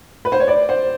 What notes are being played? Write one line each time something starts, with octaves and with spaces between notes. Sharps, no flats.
B4
C5
C#5
D5
C5